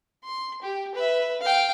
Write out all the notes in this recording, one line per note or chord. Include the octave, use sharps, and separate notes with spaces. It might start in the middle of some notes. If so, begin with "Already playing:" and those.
C6
G4
B4 E5
F5 G5